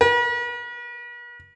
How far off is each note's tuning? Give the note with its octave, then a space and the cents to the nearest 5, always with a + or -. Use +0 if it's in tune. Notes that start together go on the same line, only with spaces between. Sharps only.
B4 -45